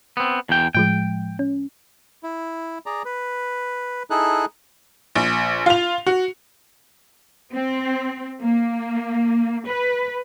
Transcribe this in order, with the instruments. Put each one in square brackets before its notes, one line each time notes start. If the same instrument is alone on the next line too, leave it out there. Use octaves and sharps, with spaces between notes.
[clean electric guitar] B3 C4
E2 G5
[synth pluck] A2 F3 G#3 [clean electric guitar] G5
[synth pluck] C#4
[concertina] E4
G#4 D5 A#5
B4
D#4 E4 G#4 A4 F#6
[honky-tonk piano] A#1
F4 F7
F#4
[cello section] C4
A#3
B4